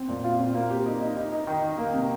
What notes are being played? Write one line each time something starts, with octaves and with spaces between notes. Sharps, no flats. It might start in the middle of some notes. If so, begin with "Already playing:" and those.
Already playing: C4
A#2
F4
C4
A#3
G4
D#4
D#4
D#4
D#4
D#3
D#3
A#3
C3